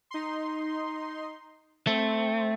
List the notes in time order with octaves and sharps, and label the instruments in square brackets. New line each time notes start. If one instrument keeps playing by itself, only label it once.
[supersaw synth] D#4 C6
[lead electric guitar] A3 [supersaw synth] C4